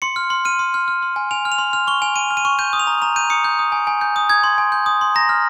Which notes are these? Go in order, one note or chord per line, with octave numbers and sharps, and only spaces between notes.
C6 C#7
F6
C6
F6 D#7
C6
F6
F6
C6
G#5
G#5 F7
F6
F7
C6
F6 F7
C#6 G7
G#5 F7
G#5 D#7
F6
D#7
C#6
G6 D#7
D#6
F7
A#5
A#5 F7
G6 D#7
D#6 C#7
G6
D#6
G#5
G#5
G6
D#6
D#6 G#6
C6
G#5
G6
D#6
C6
A#5 A#6
F6